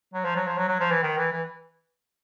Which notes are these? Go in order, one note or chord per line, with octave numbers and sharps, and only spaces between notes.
F#3
F3
F#3
F3
F#3
F#3
F3
E3
D#3
E3
E3